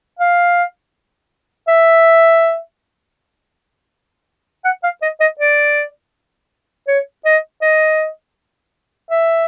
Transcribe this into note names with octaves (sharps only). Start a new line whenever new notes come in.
F5
E5
F#5
F5
D#5
D#5
D5
C#5
D#5
D#5
E5